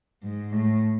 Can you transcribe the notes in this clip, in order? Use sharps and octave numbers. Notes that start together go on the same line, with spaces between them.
G#2
A2